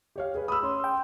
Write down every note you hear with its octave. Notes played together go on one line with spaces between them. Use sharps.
G4 C#5 F5
G#4 B4
B5 D#6 E6
C#4 C#5 C6
G5